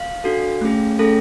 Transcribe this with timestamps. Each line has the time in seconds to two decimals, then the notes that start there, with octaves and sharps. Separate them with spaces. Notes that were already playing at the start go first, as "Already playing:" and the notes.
Already playing: F5
0.24 D4 F#4 A4
0.61 A3 C#4 G#4
0.99 A3 C#4 G#4 A4